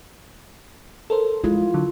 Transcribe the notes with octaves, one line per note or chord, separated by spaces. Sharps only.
A4 A#4 C5
G#3 E4 F4
D3 F#3